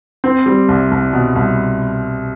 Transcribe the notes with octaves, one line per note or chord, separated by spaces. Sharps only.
C4
G3
C2
C2
B2
C2